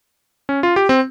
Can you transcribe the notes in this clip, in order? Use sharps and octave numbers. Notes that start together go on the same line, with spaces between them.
C#4
F4
G4
C4